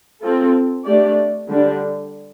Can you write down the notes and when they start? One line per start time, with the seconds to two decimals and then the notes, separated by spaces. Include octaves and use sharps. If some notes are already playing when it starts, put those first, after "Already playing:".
0.22 C4 F4 A4
0.85 A3 D4 G4 D5
1.49 D3 G3 D4